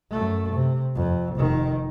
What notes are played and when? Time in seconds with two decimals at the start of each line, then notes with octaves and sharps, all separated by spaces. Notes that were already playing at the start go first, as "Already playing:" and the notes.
0.11 F#2 A3
0.54 C3
0.95 F2
1.36 F1 D#3